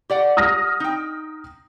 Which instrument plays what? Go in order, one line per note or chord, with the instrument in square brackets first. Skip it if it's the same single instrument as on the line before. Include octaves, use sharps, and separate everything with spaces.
[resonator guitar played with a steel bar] G4 D5 F#5
[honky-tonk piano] D#6 F6 A#6
[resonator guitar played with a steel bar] D#4 G5